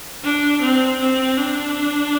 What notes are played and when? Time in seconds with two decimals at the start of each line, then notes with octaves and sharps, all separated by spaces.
0.24 D4
0.61 C4
1.00 C4
1.37 D4